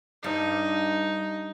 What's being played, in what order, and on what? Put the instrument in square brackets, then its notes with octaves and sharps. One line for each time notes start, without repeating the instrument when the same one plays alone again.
[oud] G2 [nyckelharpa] D#4